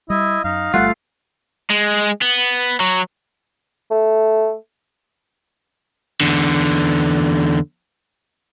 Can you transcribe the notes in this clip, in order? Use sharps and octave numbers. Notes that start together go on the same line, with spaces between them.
G3 E4 D#5
F#2 D#4 F5
G1 G3 A3 F4 F#5
G#3
B3
F#3
A3
E2 D3